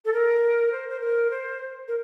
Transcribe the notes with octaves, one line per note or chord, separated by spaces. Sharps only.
A4
A#4
C5
C5
A#4
C5
A#4